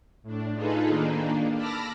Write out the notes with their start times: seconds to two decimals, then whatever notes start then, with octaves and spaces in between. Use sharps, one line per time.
0.23 A2 D4
0.55 D#4 F4 G#4 A4 B4
0.88 D#3 A#3 D4
1.55 A5 B5 D6 E6 F6 A#6